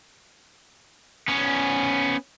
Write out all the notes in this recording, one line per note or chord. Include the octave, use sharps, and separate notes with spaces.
B3 C#4